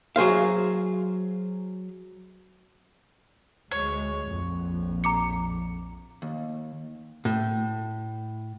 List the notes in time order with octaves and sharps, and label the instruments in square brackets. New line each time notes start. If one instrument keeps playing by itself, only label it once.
[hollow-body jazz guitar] F#3 G#4 C5 F5
[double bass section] D2 G#3 [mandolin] C#5
[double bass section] A#1 F2
[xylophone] A#5 D6 C#7
[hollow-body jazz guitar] D#2
A2